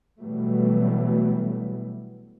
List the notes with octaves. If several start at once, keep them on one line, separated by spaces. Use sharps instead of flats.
B2 E3 F#3 G3 A3